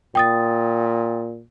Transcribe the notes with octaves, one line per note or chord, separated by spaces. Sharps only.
A#2 G5 D#6 A6